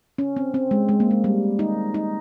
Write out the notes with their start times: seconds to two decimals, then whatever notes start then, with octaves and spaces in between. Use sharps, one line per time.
0.18 C#4
0.36 C4
0.54 C4
0.71 G#3
0.89 G#3
1.00 A#3
1.11 G#3
1.24 G3
1.59 D#4
1.94 D#4